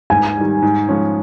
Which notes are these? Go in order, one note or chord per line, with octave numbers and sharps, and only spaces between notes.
G#2 G#5
D#3 G3
G#2
F3 G#3 C#4